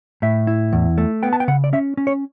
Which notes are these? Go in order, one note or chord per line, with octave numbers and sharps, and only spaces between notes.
A2 E5
E4
E2
A3
B3 G5
A5
G5
C#3 F#5
D5
C#4 E5
C#4
C#5